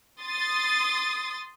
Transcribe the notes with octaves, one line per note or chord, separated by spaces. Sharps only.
C6 D#6 A6